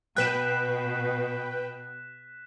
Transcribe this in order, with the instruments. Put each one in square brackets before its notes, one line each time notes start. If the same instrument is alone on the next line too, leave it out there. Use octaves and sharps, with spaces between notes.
[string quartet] B2 [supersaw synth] B4 G5 [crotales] F#6 B6 E7